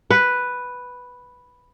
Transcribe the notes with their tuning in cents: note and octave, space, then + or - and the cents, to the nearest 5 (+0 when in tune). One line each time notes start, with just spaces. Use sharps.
B4 +0